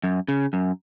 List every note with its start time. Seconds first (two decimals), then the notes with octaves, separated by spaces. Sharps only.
0.04 F#2
0.28 C#3
0.53 F#2